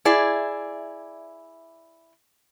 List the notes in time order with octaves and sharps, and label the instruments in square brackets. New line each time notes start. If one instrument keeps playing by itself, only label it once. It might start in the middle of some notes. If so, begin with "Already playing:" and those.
[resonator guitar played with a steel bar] E4 G#4 D5